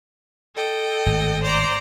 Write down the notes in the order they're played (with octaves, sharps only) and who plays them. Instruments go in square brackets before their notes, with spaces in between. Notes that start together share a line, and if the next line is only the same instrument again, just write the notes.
[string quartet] A4 D#5 G5
[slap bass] G#1 A2
[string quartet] C5 D5 A#5